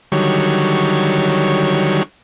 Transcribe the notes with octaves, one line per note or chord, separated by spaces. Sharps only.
D3 D#3 F#3 G3 C#5